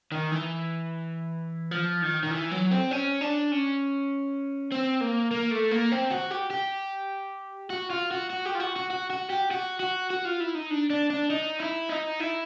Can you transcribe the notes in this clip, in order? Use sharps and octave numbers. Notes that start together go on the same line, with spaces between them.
D#3
E3
F3
D#3
D#3
E3
F#3
C4
C#4
D4
C#4
C4
A#3
A#3
A3
A#3
C4
F#4
G4
G4
F#4
F4
F#4
F#4
G4
F4
F#4
F#4
F#4
F#4
G4
F#4
F#4
F#4
F4
E4
D#4
D4
D4
D4
D#4
E4
D#4
E4